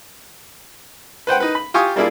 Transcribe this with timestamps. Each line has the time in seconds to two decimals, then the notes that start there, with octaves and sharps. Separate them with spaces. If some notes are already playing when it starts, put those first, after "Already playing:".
1.27 B4 C5 F#5 G5
1.40 D#4 B4
1.55 B5
1.74 F4 G4 G#5 C#6 D#6
1.96 G3 A#3 D4 E4 F4 G#4